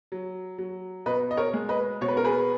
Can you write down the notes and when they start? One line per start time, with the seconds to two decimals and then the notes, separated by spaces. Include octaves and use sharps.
0.12 F#3
0.58 F#3
1.06 B2 B4 D#5
1.31 D#5
1.37 A#4 C#5
1.53 G#3
1.69 B4 D#5
2.01 B2 C#5
2.08 B4
2.17 A#4
2.25 G#4 B4